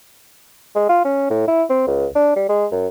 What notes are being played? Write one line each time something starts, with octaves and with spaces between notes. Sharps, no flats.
G#3
F4
C#4
A2
E4
C4
C#2
D4
G3
G#3
F#2